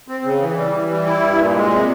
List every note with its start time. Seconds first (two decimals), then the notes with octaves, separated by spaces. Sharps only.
0.08 C4
0.24 C#3
0.41 E3
0.57 G3
0.73 E3
0.90 G3
1.06 E4
1.22 G2
1.39 A#2
1.55 G#3
1.71 C3